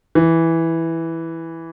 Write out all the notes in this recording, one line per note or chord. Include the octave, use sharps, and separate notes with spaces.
E3